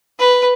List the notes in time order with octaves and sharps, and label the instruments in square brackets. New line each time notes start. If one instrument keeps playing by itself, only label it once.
[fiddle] B4